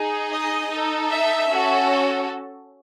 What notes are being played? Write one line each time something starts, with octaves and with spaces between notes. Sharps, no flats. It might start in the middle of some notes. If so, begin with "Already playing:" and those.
Already playing: D#4 G#4
D#5
D#4 A4
E5
C#4 F#4 A4